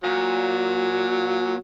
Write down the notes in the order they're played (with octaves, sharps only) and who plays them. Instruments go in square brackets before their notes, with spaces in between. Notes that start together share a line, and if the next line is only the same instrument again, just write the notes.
[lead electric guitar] A#2 [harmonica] F#3